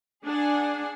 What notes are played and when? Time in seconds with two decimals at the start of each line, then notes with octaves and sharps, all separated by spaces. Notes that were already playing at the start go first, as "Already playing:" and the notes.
0.24 D4 G#4 F#5 G#5